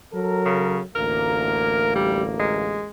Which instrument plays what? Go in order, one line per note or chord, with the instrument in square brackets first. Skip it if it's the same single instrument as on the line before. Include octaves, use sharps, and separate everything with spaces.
[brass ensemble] F#3 A4 A#4
[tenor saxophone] C#3
[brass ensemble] A1 D2 A#3 [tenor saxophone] A#4
[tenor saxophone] G3
G#3